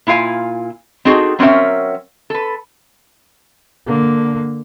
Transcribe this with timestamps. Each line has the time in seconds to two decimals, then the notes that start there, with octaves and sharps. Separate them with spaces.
0.07 A#2 E4 F4 F5 G#5
1.05 C4 D#4 F#4 G#4 A4
1.39 F#3 C4 C#4 A#4 E5
2.30 A4 B4
3.87 D3 A#3